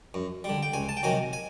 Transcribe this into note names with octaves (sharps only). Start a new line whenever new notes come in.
F#2
D3 G3
G5
C#2 G#5
A5
G5
C3 D#3 F#3 G#5
G#5